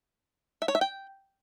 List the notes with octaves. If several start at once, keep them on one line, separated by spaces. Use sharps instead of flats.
E5
C#5
E5
G5